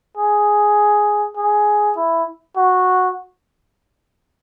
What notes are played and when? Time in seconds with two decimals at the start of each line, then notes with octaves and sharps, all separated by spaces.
0.17 G#4
1.37 G#4
1.97 E4
2.57 F#4